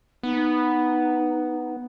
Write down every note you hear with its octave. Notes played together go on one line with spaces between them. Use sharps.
B3 D#4